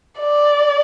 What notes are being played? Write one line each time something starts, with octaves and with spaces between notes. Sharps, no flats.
D5